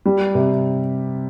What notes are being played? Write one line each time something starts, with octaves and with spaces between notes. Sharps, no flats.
G3
C3